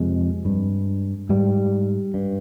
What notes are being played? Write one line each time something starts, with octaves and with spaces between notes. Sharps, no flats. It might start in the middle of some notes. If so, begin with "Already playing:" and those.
Already playing: F2 C3 G#3
G2
G#2 G3
G2